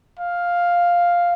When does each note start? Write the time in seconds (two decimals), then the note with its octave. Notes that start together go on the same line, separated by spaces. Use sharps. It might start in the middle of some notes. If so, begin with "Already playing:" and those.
0.19 F5